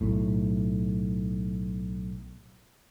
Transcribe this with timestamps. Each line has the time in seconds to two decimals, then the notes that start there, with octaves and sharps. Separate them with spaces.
0.01 B1 A2